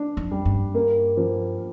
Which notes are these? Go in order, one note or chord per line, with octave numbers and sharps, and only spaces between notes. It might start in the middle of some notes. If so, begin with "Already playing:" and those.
Already playing: D4
F2
G3
G2
A#3
F3